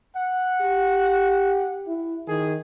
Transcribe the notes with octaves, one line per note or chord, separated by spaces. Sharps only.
F#5
G4
E4
D#3 G#4